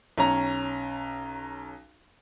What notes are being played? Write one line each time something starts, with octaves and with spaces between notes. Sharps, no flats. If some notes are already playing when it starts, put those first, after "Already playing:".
B1 C#4 A#5